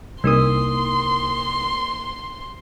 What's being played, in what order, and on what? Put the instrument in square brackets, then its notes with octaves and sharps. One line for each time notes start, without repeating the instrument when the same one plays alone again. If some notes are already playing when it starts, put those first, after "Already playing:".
[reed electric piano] C2 D#6 [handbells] A#3 D#4 A#4 [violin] C6